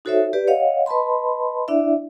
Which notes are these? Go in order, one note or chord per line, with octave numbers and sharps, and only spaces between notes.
D#4 F#4 A4 C5 C#5 E5
G4 B4 D5
C#5 D#5 F5 F#5
B4 D#5 A5 B5 C6
D4 E4 D5 E5